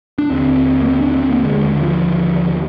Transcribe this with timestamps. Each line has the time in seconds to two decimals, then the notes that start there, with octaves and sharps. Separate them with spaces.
0.18 D4
0.30 D#2 D3 C4
0.82 A#3
0.87 C4
1.01 D4
1.11 D4
1.15 C4
1.30 A#3
1.44 D#2 D3 G#3
1.81 F3